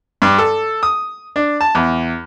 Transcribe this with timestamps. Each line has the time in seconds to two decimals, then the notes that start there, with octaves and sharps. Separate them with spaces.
0.22 G2
0.38 A4
0.83 D#6
1.36 D4
1.61 A5
1.75 E2